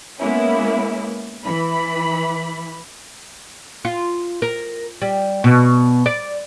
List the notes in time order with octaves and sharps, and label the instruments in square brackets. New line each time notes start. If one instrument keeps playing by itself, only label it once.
[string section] G#3 A#3 B3 C#4 E4
E3 B5
[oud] F4
A#4
G3
B2
D5